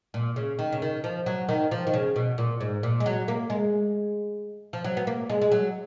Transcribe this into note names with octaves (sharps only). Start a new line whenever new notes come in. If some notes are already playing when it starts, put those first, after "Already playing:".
A#2
C#3
D#3
C#3
D#3
F3
F#3
D#3
F3
D#3
C#3
B2
A#2
G#2
A#2
G#3
F#3
A#3
G#3
F3
F#3
B3
A#3
G#3
G#3
F#3